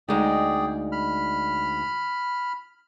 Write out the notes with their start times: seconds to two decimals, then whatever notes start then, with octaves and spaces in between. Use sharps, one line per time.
0.08 D2 G#3 D#4 G#4 D5 G5
0.92 B5 F6